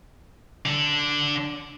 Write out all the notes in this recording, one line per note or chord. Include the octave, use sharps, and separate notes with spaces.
D3 D4